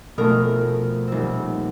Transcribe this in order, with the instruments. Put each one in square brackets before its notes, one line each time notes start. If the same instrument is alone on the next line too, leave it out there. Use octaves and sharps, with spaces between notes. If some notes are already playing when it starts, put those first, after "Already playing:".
[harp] F1 A#4 D#6 [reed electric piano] B2 A3
[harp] D#1 C4